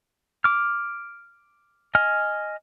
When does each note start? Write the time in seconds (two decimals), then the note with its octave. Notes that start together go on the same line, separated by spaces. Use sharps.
0.44 D6 F6
1.95 D#5 G#5 F6